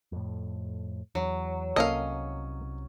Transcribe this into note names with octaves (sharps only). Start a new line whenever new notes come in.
F2 A2
E2 F#3
C2 A#3 C#4 A4 D#5 F5